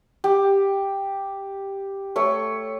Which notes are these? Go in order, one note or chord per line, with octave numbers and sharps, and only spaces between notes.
G4
A3 C#5